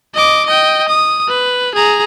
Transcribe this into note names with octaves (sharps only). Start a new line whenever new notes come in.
D#5 D6
D#5 G5
D#6
B4
G#4 A#5